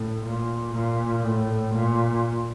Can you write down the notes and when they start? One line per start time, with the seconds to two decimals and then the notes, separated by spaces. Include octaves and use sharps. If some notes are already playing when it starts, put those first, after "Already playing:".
Already playing: A2
0.25 A#2
0.74 A#2
1.23 A2
1.74 A#2